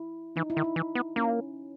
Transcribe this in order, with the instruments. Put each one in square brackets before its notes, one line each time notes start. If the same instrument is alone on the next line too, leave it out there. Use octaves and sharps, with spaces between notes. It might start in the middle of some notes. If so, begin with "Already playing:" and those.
Already playing: [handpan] E4
[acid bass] E3 [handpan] D#4
[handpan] E4
[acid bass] D#3
[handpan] D#4
[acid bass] E3
B3
[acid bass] A#3 [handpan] C#4